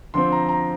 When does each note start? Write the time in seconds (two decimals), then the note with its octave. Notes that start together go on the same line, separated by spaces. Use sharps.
0.14 D3 F3 C4 C6
0.32 A#5
0.49 A#5